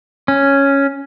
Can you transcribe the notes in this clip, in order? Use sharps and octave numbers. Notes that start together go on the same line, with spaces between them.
C#4